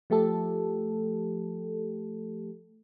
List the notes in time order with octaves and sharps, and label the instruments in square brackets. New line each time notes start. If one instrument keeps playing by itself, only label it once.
[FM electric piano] F3 A3 G4 A4